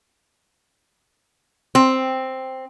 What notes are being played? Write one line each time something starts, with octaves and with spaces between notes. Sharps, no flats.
C4